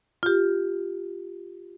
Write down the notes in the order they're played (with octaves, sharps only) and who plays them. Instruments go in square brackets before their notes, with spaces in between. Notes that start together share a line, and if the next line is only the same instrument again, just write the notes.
[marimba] F4 G4